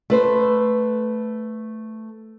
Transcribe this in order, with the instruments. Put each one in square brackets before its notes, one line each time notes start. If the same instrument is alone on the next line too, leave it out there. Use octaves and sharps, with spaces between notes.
[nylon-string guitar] A3 B4 C5